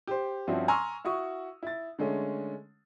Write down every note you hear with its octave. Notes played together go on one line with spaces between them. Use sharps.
G4 C5
G2 F3 C4 C#4 E4 F#4
G#5 A#5 C6 C#6 E6 F6
E4 F#4 C#6 D#6
E4 A6
D3 G#3 A3 C#4